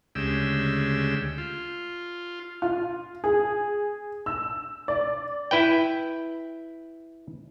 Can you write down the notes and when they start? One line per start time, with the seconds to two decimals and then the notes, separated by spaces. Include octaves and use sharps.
0.15 D2 C#3 G#3 G4 E6
1.38 F4
2.62 F4
3.24 G#4
4.26 E6
4.88 D5
5.51 E4 B4 G5